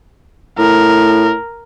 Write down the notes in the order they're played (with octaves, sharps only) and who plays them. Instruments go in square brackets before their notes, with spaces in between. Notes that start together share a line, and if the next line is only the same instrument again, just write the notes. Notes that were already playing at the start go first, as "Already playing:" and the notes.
[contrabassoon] A2 [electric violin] A#4